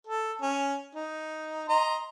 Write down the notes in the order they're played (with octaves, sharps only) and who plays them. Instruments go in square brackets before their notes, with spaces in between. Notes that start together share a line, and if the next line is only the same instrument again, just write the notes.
[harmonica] A4
C#4
D#4
D#5 A#5 C6